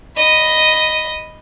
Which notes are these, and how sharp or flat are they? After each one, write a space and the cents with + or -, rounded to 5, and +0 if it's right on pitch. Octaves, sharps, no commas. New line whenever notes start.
D#5 +0 B5 -5